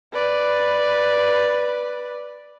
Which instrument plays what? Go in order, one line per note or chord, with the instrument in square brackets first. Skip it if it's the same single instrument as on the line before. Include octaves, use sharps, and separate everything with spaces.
[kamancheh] B4 D5